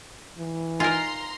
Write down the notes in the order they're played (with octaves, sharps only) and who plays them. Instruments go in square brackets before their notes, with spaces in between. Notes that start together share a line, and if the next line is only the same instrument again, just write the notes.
[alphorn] E3
[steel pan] D#4 F5 G#5 [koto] F4 A#4 [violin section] A#5 C6